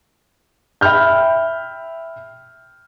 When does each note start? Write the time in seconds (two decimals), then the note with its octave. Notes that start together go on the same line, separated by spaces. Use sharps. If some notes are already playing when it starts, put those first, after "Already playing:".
0.81 E5 G5 B5 F6 G6